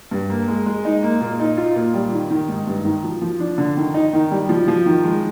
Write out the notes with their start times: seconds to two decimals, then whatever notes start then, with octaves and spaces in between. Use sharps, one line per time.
0.11 G2
0.30 A#3
0.48 G#3
0.66 G#3
0.85 D#4
1.03 A#3
1.21 A#2
1.40 D#4
1.57 F4
1.76 A#2
1.94 G3
2.13 D#3
2.30 D#3
2.49 G#2
2.67 G2
2.85 D#3
3.04 F3
3.22 F3
3.40 D4
3.58 D3
3.77 D#3
3.94 D#4
4.13 D#3
4.31 G3
4.49 F3
4.68 F3
4.86 D#3
5.04 G#3